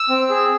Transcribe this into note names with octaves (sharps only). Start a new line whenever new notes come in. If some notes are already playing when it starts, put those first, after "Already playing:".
Already playing: E6
C4
G#4